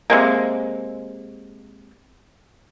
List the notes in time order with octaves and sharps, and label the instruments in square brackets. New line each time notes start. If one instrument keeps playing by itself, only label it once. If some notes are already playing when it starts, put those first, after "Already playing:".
[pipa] C3 G#3 A#3